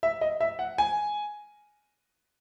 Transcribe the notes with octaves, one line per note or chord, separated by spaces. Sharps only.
E5
D#5
E5
F#5
G#5